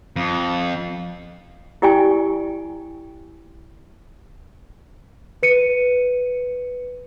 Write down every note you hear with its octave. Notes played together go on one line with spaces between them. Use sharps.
F2
E4 G4 D5 G5 G#5 C#6
B4 C#7 D#7